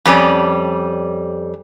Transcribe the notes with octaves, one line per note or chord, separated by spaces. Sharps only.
F2 G3 C#4 D5